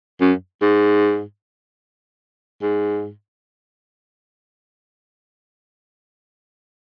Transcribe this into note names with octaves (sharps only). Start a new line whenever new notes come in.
F#2
G#2
G#2